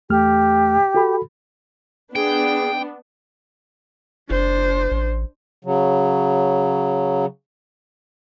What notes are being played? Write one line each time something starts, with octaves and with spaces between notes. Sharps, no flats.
E2 A3 G4 F6
F#4 A4 B5
B3 D4 G#4 G5
F#1 D4 C5
A1
C#3 F#3